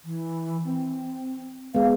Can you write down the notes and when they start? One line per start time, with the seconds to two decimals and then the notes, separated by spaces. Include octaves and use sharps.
0.05 E3
0.64 C4
1.75 G#3 B3 F5